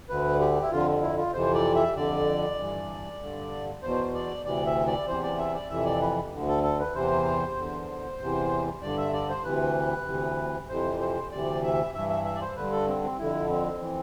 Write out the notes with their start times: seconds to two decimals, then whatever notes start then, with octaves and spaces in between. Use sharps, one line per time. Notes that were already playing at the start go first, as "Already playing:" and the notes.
0.08 D2 D3 B4
0.40 G4
0.62 E4
0.72 F2 D3 F4
1.02 E4
1.17 F4
1.33 F2 C3 E3 C5
1.54 D5
1.75 E5
1.96 F2 D3 D5
2.58 G2 E3
3.21 G2 D3
3.83 E2 B2 C5
4.14 D5
4.45 D2 C3 E3 D5
4.66 E5
4.87 D5
5.08 E2 C3 E3 C5
5.23 D5
5.38 E5
5.54 D5
5.70 F2 C3 E3 E5
5.85 D5
6.02 B4
6.33 D2 D3
6.48 A4
6.63 A4
6.80 B4
6.95 E2 C3 E3 C5
7.57 E2 D3
8.20 E2 C3 E3
8.82 G2 D3 D5
8.97 E5
9.13 D5
9.29 C5
9.44 D2 C3 E3 B4
10.07 D2 C3 E3
10.69 F2 C3 E3 C5
11.00 C5
11.31 D2 C3 E3 D5
11.63 E5
11.94 G2 E3 E5
12.10 E5
12.25 E5
12.35 D5
12.41 C5
12.56 G2 D3 B4
12.72 A4
12.88 C4
13.03 C4
13.18 F2 D3 E4
13.49 C4
13.81 E3